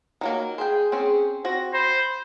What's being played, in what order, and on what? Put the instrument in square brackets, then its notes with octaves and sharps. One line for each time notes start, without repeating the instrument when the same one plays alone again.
[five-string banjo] D#3 F#3 A#3
[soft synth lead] G#4 [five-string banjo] C5 G5
[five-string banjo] C4 C#4 C5
[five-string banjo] C4 F#4 [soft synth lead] A#6
[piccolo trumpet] C5 [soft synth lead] B5